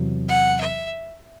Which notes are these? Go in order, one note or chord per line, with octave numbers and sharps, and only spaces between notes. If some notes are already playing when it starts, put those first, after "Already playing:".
Already playing: E2 C3 F#3
F#5
E5